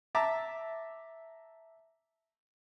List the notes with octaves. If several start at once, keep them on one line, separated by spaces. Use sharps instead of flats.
E5 A5 A#5 D6